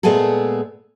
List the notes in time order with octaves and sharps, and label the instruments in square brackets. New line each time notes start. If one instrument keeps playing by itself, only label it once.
[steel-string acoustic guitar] A#2 G#3 A3 B3 G#4 A4